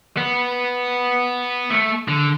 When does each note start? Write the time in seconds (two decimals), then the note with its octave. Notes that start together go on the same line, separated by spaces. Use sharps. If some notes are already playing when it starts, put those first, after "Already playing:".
0.18 B3
1.70 A3
2.08 D3